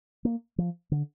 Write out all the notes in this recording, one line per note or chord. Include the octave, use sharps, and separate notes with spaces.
A#3
F3
D3